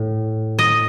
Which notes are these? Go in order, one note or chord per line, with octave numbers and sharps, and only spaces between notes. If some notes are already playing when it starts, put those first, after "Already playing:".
Already playing: A2
D#5